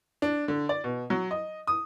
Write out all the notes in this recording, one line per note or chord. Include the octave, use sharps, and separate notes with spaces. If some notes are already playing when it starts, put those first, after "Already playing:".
D4
D3
D5
B2
F#3
D#5
D#6